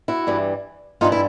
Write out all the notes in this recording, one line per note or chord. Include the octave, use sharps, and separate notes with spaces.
E4 F#4
G2 E3 G3
G2 E3 G3 D#4 F4
E4